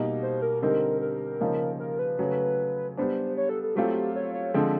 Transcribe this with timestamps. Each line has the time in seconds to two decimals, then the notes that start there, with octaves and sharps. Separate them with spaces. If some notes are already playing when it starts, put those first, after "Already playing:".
Already playing: B2 G3 A#3 D#4
0.22 C5
0.42 A#4
0.62 D3 G3 C4 D#4 A#4
1.01 A#4
1.41 C#3 F3 A#3 D#4
1.79 A#4
1.99 B4
2.19 C#3 F#3 A3
2.97 G3 B3 D4 C5
3.37 C#5
3.49 A4
3.63 A4
3.75 F#3 A3 C4 F4 G4
4.16 C#5
4.34 C#5
4.54 D3 F3 G#3 C4